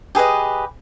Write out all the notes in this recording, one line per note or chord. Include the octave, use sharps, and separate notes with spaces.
G4 G#4 B4 D#5